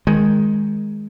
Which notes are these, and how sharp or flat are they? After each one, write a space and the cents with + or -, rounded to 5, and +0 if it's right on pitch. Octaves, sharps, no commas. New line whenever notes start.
D#3 +10 G#3 +0